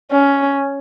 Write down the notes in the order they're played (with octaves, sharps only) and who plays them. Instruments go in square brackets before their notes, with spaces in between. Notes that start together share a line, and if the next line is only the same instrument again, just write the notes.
[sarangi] C#4